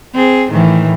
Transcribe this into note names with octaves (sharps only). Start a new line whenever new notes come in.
C4 G#4
A2 D#3 E3